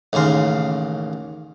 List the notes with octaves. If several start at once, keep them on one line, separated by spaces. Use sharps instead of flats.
A1 D#2 C#3 A#4 C6